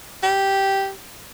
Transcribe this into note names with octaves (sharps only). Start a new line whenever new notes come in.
G4